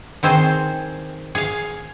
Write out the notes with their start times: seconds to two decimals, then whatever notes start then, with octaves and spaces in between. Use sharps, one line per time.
0.23 D#3 C4 G#4 C5
1.35 G#4 F5